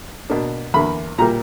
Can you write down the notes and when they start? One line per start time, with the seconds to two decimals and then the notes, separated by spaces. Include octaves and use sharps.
0.30 B2 A#3 D4
0.74 E2 D3 A#3 B5
1.18 A#2 G3 A#3 A#5